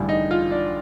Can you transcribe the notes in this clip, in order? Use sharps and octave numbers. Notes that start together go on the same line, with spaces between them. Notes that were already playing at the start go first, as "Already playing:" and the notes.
Already playing: A1 G2 D3 G3
D#4
F4
D4